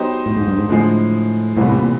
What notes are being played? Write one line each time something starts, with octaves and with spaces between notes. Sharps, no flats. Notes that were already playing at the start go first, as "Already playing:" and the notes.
Already playing: F#3 B3 D#4 G4 C5
A2
G#2
G2
G#2
A2 D3 F3 G#3
C2 A2 C3 E3 G3 B3
A2
A#2